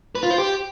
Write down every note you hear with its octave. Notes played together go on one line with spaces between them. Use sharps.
B4
F4
C5
G4